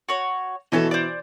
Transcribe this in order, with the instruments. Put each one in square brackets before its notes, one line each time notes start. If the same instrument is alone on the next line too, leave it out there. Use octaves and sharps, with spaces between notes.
[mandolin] F#4 C#5
[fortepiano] B2 E3 [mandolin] A4 C#5 D#5
[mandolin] C5 D5